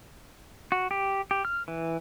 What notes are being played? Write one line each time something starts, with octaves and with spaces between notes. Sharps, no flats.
F#4
G4
G4
F6
E3